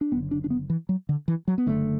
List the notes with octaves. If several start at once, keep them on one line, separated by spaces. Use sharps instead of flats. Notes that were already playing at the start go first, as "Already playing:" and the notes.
D4
F#1 F#2 D3 B3
D4
D4
B3
E3
F#3
D3
E3
F#3
B3
F#1 F#2 D3 A3